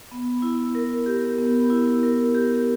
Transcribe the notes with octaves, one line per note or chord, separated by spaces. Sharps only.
B3
E4
A#4
G4
B3
E4
A#4
G4